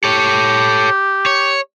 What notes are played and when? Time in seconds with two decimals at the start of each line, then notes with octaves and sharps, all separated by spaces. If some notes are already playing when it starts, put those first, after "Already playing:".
0.04 G4 A4 C#5
1.26 C#5